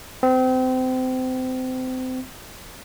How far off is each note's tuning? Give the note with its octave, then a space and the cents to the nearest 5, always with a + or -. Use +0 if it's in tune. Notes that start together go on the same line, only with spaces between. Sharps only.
C4 -30